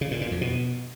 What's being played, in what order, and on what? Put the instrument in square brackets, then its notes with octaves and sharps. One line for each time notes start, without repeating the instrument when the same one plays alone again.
[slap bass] C#3
A#2
A#2
F2
B2